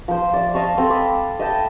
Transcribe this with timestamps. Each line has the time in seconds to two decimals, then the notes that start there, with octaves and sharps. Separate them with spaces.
0.08 F3 C5
0.34 D5 E5
0.54 D#5 F5 A5 C#6
0.78 C4 A4
0.90 B5 D6
1.39 D#5 E5 G5 A5